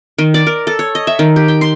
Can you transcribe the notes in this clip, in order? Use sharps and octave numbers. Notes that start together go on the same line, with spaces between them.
D#3
D5
A#4
A4
C#5
D#5
E5
D#3
G4
G5
C6